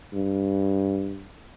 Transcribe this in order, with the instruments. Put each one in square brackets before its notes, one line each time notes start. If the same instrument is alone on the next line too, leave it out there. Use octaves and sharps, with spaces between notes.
[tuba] G2